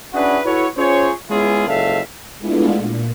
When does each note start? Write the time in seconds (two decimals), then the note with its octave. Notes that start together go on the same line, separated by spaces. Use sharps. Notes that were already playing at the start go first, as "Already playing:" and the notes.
0.14 C#4 D4 E4 F#4 G#4 B4
0.45 E4 F#4 A4 B4 C#5
0.77 C#4 F4 G#4 C5 C#5
1.30 G#3 B3 C#4 E4 F4 G#4
1.68 F#1 C#2 C#3 A4 E5 F5
2.38 G#3 A3 B3 D4 E4 F4
2.76 A#2